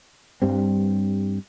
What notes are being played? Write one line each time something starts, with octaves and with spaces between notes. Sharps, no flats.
G2 G3 C4